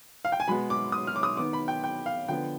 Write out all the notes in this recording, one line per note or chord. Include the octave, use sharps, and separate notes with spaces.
F5
G5
G#5
B2 G#3 B3 B5
D6
D#6
F6
D6
D#6
D#3 B3 D6
B5
G5
G5
F5
D3 F3 B3 G5